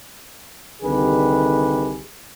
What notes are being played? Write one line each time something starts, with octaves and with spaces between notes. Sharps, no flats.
C2 D3 D#3 G4 G#4 B4